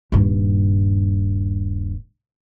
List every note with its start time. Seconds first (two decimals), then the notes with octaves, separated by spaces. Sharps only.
0.12 D#1 G2